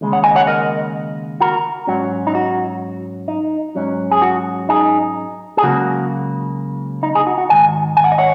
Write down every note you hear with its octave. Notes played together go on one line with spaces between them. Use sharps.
D#2 C#3 G#3
C#5 F#5
D#5 G#5
C#5 F#5
A#4 D#5
F#4 A#4
G#2 F#3 C#4 F#4
D#4
F#4
D#4
G#2 F#3 C#4
G#4
F#4
D#4 G#4
G#4
C#2 C#3 F#3 A#3 F#4
D#4
D#4 G#4
F#4
F#4
G#2 D#3 G#5
G#5
F#5
D#5
C#5 F#5